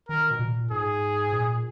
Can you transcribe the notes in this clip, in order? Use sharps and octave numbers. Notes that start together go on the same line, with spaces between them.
D#3 A#4
B2
A#2
G#2 G#4
A#2